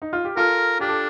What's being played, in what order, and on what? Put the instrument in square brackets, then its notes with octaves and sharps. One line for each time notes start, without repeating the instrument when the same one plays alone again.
[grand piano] D#4
F4
G4
[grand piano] F4 A4 [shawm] A#4
[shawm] D4 [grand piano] G4
[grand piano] A4